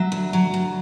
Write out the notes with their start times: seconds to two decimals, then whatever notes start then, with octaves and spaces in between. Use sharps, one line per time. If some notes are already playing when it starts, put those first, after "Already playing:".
Already playing: F#3 E5
0.12 D2
0.33 F#3
0.54 D2